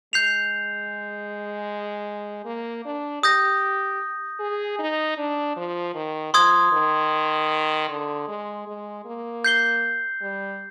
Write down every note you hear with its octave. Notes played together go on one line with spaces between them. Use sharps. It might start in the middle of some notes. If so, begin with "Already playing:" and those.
G#3 G6 C7 F7
A#3
D4
G4 D#6 G6 A#6
G#4
D#4
D4
F3
D#3
F3 C6 D#6 G#6
D#3
D3
G#3
G#3
A#3
G6 C7 G7
G3